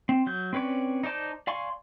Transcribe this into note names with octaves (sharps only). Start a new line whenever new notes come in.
C4
F#3 G6
C4 C#4 B4 C#5 D5
D#4 C5 D5 A5 G6
D5 F5 G#5 C6 C#6